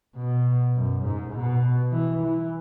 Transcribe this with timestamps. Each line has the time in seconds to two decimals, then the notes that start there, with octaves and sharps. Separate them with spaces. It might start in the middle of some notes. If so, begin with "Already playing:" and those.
0.16 B2
0.75 F#2
1.04 G#2
1.34 B2
1.92 E3
2.22 E3